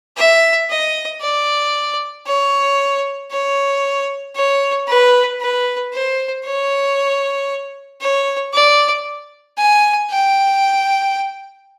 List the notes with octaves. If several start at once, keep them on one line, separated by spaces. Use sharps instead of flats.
E5
D#5
D5
C#5
C#5
C#5
B4
B4
C5
C#5
C#5
D5
G#5
G5